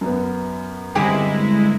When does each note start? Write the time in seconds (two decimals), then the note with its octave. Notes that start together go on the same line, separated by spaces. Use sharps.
0.01 F#2 B3
0.95 G2 D3 G3 G#3 C4 E4 G4 G#4